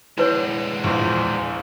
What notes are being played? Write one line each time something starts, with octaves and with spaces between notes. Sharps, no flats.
G#3 D4 E4 B4 C#5
A#1 E2 C5